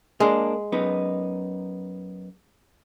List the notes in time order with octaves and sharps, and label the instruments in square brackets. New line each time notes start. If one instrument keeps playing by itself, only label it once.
[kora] G#3 [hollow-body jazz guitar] A#3 D4
[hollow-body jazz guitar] F#2 B3 D#4